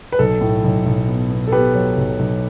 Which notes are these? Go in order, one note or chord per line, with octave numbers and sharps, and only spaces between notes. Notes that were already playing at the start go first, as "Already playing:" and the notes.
B4
B1 A4
A2
B1
B1
B3
B3
A4
B3 G4 B4
F#3
B1
B1